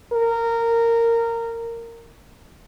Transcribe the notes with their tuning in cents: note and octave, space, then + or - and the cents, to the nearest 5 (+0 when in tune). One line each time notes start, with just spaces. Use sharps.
A#4 -15